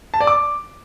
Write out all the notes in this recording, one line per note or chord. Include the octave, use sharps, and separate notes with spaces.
A5
D5
D6